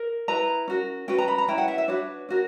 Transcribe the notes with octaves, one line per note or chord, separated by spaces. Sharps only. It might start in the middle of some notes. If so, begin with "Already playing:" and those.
Already playing: A#4
E4 B4 A#5
C#4 F#4 A#4
C#4 F#4 B4 G5
A#5
B5
A#5
C#4 E4 B4 G5
F#5
E5
E5
D4 F#4 B4 C#5
C#4 F#4 A#4